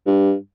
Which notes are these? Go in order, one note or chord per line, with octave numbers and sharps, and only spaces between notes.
G2